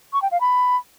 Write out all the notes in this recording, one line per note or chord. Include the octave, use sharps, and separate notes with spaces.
C#6
G5
F5
B5